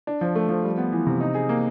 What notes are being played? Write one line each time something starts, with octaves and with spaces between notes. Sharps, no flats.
D4
F3
A3
F3
G3
B3
E3
C3
D#4
G#4
A#3